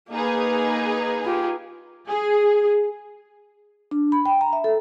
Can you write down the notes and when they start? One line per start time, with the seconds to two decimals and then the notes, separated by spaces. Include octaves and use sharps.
0.11 A#3 D#4 G#4 B4
1.24 F4 G4
2.08 G#4
3.91 D4
4.12 B5
4.25 G5
4.41 A#5
4.53 E5
4.64 A4